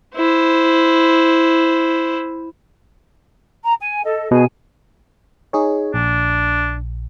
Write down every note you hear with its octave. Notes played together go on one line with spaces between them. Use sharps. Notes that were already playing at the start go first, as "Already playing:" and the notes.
E4 C5
A#5
G#5
A4 D#5
B2 G#4 G#5
D#4 G#4 C#5
A#1 D4